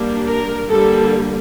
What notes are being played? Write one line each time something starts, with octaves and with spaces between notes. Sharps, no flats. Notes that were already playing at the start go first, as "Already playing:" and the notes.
Already playing: G3 A#3 D4
A#4
D3 G3 A#3 A4